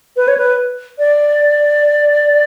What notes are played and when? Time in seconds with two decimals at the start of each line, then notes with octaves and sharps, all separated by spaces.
0.17 B4
0.28 C#5
0.37 B4
0.99 D5